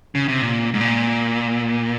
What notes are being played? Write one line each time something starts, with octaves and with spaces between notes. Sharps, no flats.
C#3
C3
A#2
G#2
A#2